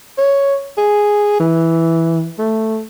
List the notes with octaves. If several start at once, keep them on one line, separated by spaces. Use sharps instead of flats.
C#5
G#4
E3
A3